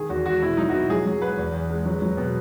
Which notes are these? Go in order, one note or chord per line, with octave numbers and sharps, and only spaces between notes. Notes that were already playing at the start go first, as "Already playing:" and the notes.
Already playing: D#3 G#4
E2 F#4
G#3 F#4
B2 E4
F#3 D#4
F#4
B2 E4
F#3 G#4
F#3
G#2 B4
E2
E2
G#3
F#3
F#3
B2